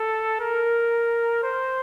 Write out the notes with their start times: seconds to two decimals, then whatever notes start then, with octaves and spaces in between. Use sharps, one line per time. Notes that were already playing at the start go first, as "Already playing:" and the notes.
Already playing: A4
0.40 A#4
1.43 C5